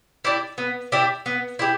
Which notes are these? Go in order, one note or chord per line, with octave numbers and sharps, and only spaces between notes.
E4 G4 D5
B3
E4 G4 D5
B3
E4 G4